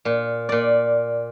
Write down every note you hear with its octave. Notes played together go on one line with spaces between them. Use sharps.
A#2
A#2 D5